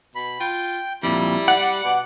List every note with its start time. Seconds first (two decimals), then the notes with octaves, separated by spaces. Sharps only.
0.15 B2 B5
0.40 F4 G5
1.03 F2 A#2 G3 E4
1.48 D5 F#5
1.84 B2 D6